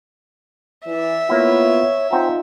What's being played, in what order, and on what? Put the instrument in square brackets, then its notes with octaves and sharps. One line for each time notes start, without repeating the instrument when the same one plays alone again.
[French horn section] E3 [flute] D5 [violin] E5
[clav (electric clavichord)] A#3 E4 [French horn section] B3 F4 [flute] C#5
[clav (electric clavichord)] C4 A#5 [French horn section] D#4 F4 [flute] F#5